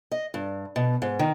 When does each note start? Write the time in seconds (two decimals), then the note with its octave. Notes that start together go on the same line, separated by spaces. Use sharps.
0.11 D#5
0.34 G2
0.76 B2
1.02 G#2
1.19 D#3